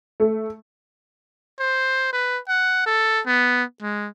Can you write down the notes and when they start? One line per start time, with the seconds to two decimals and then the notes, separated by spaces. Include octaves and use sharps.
0.20 A3
1.59 C5
2.13 B4
2.48 F#5
2.86 A4
3.26 B3
3.82 G#3